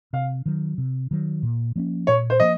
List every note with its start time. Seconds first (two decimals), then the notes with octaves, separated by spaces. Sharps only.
0.13 C3 F5
0.46 D#3 F#3
0.78 C3
1.11 D#3 F#3
1.43 A#2
1.76 F3 A#3 C#4
2.07 A#2 C#5
2.30 C5
2.40 F3 A#3 D#5